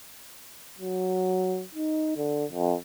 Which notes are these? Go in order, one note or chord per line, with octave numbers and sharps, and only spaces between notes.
F#3
D#4
D3
F2